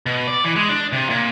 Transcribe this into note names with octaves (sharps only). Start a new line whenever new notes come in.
B2
D5
E3
G#3
D4
C3
A#2